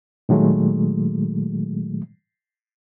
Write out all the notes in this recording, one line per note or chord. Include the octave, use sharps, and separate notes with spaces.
A#2 D#3 F#3 G#3 A3